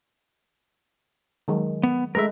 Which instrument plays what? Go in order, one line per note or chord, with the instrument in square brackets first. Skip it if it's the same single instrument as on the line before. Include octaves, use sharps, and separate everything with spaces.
[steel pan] D#3 F#3 G#3
[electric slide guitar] B3
[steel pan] G#3 A3 B4 [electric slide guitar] A#4 E5